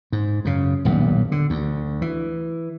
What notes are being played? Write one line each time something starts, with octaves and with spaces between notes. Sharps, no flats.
G#2
F#2 C#3
D#1 B1 G2
D3
D2
E3